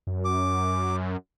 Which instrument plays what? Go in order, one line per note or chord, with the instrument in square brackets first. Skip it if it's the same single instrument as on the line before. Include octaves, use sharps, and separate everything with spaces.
[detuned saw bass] F#2
[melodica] D6